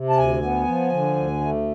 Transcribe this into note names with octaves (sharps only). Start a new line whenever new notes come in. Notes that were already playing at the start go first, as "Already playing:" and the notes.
Already playing: C3
A5
D2 G#5
B3
F3
D3
D2
A3